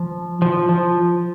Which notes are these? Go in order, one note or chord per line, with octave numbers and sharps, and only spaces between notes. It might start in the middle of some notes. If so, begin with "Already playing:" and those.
Already playing: F3
F3
F3